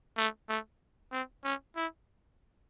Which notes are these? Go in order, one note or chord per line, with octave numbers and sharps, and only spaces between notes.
A3
A3
C4
C#4
E4